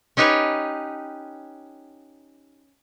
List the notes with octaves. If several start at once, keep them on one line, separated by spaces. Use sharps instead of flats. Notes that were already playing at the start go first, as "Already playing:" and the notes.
C#4 D#4 G4 B4 C#5